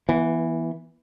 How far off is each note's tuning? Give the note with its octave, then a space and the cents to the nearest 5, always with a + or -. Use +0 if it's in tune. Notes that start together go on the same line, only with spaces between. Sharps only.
E3 +0 B3 -25